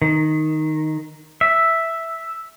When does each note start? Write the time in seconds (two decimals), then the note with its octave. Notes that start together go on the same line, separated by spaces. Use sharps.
0.02 D#3
1.41 E5